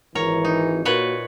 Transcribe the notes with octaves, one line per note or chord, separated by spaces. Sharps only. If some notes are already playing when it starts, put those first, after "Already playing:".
G#1 E3 A#4 C#5
D#4
A#2 A#3 F#4 A#4 B4 C#5